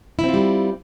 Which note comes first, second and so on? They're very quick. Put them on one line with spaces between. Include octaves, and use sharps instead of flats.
E4 C4 F4 G3